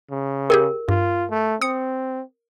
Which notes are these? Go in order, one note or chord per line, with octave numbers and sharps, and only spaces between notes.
C#3
G4 G#4 A#4 G5
G2 F4
A3
C4 D#6 C#7